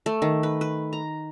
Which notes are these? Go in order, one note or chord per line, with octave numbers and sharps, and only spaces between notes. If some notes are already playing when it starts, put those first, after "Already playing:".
A3
D#3
B4
B4
A#5